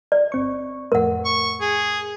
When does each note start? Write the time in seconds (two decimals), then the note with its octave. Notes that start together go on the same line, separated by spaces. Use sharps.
0.12 D5
0.32 G1 C4 C#6
0.92 F2 A2 A3 A#4 F#5
1.25 C#6
1.61 G#4